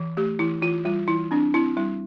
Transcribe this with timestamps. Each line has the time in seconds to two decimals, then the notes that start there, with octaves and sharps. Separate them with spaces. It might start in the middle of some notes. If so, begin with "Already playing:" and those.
Already playing: E3
0.17 A3 G4
0.39 E3 E4
0.62 E3 F4
0.85 G3 F4
1.08 E3 E4
1.31 C4 D4
1.54 C4 E4
1.77 G3 E4